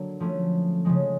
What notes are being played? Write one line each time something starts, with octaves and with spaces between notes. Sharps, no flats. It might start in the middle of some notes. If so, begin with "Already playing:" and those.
Already playing: D3 F#3 A#3
F3 A3 C#4
C#3 F3 G#3